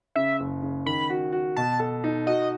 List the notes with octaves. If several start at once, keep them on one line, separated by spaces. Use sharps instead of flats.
C#3 E5
F#1
C#3
D#3 B5
F#4
F#4
B2 A5
A4
D#4
F#4 D#5